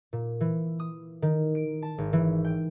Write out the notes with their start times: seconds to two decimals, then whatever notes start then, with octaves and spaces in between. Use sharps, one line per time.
0.13 A#2
0.40 E3
0.80 D#6
1.22 D#3
1.55 D7
1.82 A5
1.98 G#1
2.13 E3
2.45 G5